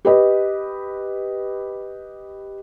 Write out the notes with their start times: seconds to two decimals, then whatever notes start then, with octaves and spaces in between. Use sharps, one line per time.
0.05 G4 B4 D#5